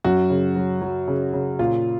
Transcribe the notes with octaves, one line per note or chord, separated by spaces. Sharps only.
F#2 F#4
C#3
F#3
F#3
C#3
C#3
A#2 F4